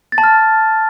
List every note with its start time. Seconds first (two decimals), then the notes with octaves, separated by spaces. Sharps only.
0.12 A6
0.18 A5
0.24 F6